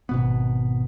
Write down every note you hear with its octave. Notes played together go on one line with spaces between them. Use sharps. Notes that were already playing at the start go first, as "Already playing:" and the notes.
G#1 B2 B3